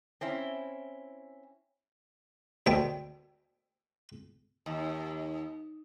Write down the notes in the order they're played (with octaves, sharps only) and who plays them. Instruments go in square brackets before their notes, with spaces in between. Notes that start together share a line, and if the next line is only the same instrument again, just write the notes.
[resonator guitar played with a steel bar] C4 C#4 E4
[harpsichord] D2 D#3 G5
[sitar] D#2